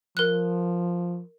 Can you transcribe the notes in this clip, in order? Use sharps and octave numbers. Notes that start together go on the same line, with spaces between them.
F3 A#4 F#6